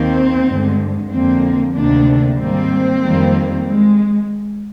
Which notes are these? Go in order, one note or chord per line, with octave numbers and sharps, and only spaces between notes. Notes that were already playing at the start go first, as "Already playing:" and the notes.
Already playing: D#2 D#3 A#3 C4
G2 D3 G#3
F2 D3 F3 A#3 C4
D2 C3 D#3 A#3 D4
G#2 D#3 G3 A#3 C4
F2 D#3 G3 A#3
G#3